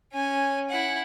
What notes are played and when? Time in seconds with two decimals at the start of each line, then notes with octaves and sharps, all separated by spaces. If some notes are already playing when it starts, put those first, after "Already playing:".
0.12 C#4 G#5
0.70 E4 F#5